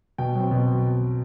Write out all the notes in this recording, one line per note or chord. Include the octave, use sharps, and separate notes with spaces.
B2 G5
F#3 C4
B2